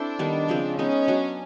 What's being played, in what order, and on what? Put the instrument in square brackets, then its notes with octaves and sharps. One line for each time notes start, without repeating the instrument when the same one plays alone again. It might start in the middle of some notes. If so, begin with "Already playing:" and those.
Already playing: [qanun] C4 E4 A4 C5 [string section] D4
[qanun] D#3 G3 B3
C#3 F3 G#3 C4
[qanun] G#3 B3 D#4 [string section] C#4
[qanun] F#3 B3 D4